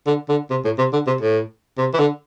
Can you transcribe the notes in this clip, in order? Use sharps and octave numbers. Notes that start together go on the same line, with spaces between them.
D3
D3
C3
A2
C3
D3
C3
A2
C3
E3
D3